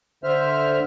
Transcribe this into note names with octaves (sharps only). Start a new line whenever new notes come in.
D3 C5 E5 F6